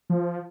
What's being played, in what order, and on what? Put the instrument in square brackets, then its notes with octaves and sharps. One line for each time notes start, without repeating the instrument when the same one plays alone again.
[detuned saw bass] F3